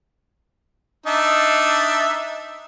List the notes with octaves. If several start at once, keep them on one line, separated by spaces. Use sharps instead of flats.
D4 D#4 E5